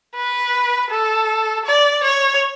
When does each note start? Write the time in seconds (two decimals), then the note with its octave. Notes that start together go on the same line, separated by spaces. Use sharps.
0.16 B4
0.90 A4
1.66 D5
2.03 C#5